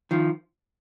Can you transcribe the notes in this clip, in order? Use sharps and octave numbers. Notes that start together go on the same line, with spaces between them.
D#3 F3